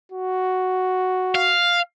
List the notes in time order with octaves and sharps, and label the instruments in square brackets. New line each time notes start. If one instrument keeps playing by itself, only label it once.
[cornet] F#4
[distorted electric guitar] F5